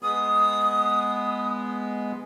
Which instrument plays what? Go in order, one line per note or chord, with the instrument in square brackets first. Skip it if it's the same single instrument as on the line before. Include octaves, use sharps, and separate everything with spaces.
[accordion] G#3 B3 [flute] D#6